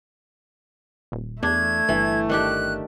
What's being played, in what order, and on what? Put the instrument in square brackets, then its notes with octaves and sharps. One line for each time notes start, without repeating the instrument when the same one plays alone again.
[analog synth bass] D#1
[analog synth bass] E2 [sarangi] A3 [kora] D4 [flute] G#6
[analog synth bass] G1 [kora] E3
[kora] D#3 D4 G4 [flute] F#6